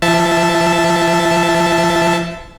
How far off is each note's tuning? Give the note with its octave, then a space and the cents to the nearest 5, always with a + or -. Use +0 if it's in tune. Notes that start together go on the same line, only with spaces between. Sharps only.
F3 -40 E5 +0 A5 +0